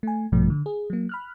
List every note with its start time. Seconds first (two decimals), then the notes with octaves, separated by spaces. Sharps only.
0.03 A3 G#5
0.32 A#1 G2 B2 F3 A3
0.50 D3
0.66 G#4
0.90 F#3 A#3
1.09 B5 F6 F#6